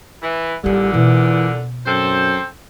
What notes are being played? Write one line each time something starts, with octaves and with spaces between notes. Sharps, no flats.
E3
A1 E2 A#2 D3 G3 D#4
B2 E3
F#2 C4 A4 C5